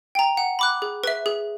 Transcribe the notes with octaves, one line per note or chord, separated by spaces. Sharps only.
G5 A#5
F#5
B5 D6 F#6
G#4
B4 E5
G#4